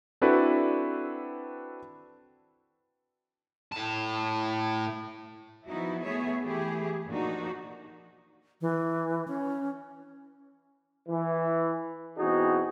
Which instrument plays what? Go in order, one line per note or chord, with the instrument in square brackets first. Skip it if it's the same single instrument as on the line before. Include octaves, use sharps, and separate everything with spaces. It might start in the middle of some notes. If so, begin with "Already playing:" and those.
[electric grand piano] C4 D4 E4 F#4 A4 B4
[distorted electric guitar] A2 A5
[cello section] F3 B3 D#4 E4 F#4
A3 B3 G#4 C#5 E5
E3 A3 E4 G4 G#4
A#2 F3 D4 D#4 F#4
[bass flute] E3
C#4
[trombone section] E3
B2 E3 C4 D#4 F#4 G#4